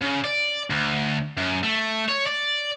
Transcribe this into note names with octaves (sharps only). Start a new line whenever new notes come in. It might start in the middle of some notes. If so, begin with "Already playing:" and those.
C#3
D5
D2
F#2
A3
C#5
D5